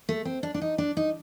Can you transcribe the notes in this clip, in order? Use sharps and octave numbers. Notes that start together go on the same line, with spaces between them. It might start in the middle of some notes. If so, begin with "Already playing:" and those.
A3
C4
D4
D4
D#4
D4
D#4